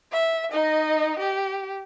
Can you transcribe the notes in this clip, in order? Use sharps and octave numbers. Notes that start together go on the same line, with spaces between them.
E5
D#4 D#5
G4